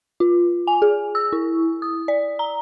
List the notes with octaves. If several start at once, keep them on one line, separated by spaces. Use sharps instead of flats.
F4
G#5
G#4
E6
E4
D#6
D5
A#5